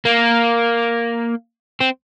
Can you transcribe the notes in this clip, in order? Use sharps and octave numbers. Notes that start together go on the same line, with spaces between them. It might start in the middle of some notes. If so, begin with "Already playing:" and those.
A#3
C4